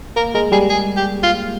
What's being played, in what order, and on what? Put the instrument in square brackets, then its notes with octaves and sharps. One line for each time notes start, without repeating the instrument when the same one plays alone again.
[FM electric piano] A#3 [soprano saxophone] A#4
[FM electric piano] G#3 [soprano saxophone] A#4
[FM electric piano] G3 [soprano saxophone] G#4
[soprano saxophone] G#4
G4
F4